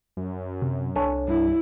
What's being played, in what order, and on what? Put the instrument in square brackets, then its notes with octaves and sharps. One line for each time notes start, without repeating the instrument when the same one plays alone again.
[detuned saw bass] F#2
[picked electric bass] C3
[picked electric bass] C2 D4 [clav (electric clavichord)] A4 C#5 G#5
[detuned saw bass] G2 [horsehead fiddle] E4